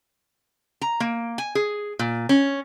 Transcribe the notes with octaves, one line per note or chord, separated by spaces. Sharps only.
A#5
A#3
G#5
G#4
A#2
C#4